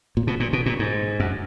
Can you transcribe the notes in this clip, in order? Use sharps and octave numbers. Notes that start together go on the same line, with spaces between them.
A#2
B2
A#2
B2
A#2
G#2
F#2